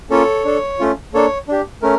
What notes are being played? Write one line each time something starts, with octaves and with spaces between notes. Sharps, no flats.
A#3 C#4 F4 A4 C#5
D4 A4
A3 C#4 F4
A#3 D4 A4 C#5
D4 G4
A3 C#4 A#4